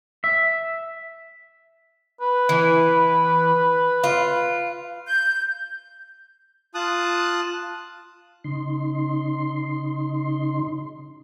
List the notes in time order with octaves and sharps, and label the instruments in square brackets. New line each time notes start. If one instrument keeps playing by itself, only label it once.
[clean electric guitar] E5
[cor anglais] B4
[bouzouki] E3
F4
[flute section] G6
[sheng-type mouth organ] F4 A5 D#6 F#6
[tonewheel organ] C#3 D#4 C6